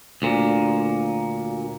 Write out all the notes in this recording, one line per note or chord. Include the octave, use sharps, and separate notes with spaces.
D2 A#2